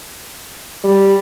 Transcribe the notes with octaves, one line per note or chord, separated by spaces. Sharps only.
G3